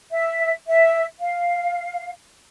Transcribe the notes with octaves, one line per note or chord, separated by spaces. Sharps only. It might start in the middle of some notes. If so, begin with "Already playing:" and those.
E5
E5
F5